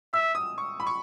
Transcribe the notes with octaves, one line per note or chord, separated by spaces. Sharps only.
E5 E6
D#6
C#6
B5
C#6